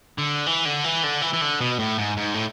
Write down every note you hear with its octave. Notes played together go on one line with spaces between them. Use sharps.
D3
E3
D3
E3
D3
E3
E3
D3
B2
A2
G#2
G#2
A2